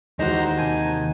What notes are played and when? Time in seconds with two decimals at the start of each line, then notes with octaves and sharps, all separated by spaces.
0.19 D#2 E3 G#3 D#4 F#4 C5 F#5 A#5
0.58 C3 C5 G#5 A5